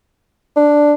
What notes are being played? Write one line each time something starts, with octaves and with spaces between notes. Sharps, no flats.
D4